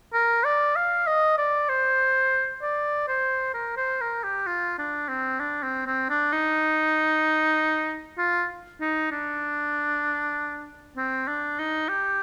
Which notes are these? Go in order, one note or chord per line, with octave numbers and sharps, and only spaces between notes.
A#4
D5
F5
D#5
D5
C5
D5
C5
A#4
C5
A#4
G4
F4
D4
C4
D4
C4
C4
D4
D#4
F4
D#4
D4
C4
D4
D#4
G4